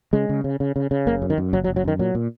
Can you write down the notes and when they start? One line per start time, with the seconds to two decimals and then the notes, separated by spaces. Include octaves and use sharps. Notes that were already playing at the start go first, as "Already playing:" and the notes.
0.13 C#3 G#3
0.29 C#3
0.44 C#3
0.60 C#3
0.76 C#3
0.91 C#3
1.07 F#1 A#3
1.22 F#2
1.30 D#3
1.38 F#2
1.53 F#1 F#3
1.64 F#3
1.68 F#1
1.76 F#3
1.84 F#2 D#3
1.99 A#2 F#3
2.15 A#2